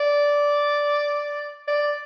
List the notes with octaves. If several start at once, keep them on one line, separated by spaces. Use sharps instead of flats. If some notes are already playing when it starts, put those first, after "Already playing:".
Already playing: D5
D5